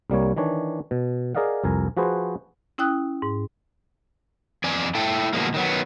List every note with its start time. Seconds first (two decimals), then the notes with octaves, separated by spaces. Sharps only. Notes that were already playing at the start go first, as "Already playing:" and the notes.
0.10 C2 G3 A#3 C#5
0.36 D#3 E3 D4 C#5
0.91 B2
1.35 G#4 A#4 D5 D#5 F5 F#5
1.64 C2 F2 A#4 G#5
1.97 F3 F#4 G#4 B4 C5
2.78 C#4 E4 G5 D#6 F#6
3.22 G#2
4.64 F2 D5 G#5
4.95 E4 A4 G5
5.33 B2 D#3 F3 G#3 A#3
5.54 D#3 F#3 B3